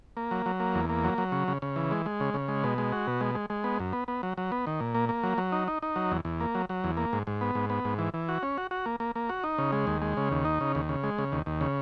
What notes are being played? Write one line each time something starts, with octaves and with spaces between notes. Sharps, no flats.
A#3
F#3
F#3
A#3
E2
A#3
F#3
F#3
C#3
C#3
C#3
E3
G#3
G#3
C#3
C#3
G#3
B2
G#3
F#4
B2
G#3
G#3
G#3
B3
F#2
B3
B3
F#3
F#3
B3
D#3
A#2
A#3
A#3
F#3
F#3
D#4
D#4
D#4
F#3
E2
E2
A#3
F#3
F#3
E2
A#3
G#2
G#2
B3
G#2
B3
G#2
E3
E3
F#4
C#4
F#4
F#4
A#3
A#3
A#3
F#4
D#4
C#3
G#3
D#2
G#3
C#3
D#2
D#4
C#3
D#2
C#3
G#3
C#3
D#2
D#2
C#3